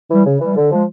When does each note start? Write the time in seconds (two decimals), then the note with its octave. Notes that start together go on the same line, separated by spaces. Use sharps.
0.09 E3 G3
0.25 C#3
0.39 E3 G3
0.56 D3
0.71 F3 G#3